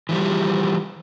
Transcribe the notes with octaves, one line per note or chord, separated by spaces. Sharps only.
E3 F3 G3